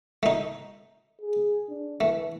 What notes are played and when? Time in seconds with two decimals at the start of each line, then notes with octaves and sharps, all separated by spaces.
0.23 A3 D#4
1.21 G#4
1.69 D4
2.01 E3 A3